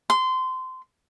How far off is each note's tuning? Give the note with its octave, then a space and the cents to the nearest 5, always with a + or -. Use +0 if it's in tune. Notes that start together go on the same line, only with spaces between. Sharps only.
C6 -20